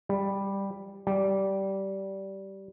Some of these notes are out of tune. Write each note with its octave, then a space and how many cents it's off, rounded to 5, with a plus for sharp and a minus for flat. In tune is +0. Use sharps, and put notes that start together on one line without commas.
G3 +5
G3 -15